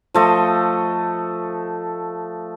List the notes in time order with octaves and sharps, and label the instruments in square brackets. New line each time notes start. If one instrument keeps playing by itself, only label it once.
[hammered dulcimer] F3 A3 D#5